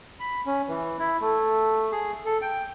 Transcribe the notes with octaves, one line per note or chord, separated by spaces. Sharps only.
B5
C#4
E3
E4
A3
G#4
A4
G5